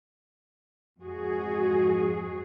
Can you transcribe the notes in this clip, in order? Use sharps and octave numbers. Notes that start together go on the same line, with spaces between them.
F2 G#2 F#4 G#4